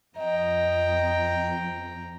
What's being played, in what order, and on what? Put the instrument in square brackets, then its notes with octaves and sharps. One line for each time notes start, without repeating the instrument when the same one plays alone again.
[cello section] F2 [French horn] D#5 [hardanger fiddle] G5 A#5